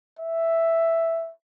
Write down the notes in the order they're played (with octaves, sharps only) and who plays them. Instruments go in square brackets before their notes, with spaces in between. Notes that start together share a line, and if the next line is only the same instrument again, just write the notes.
[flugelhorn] E5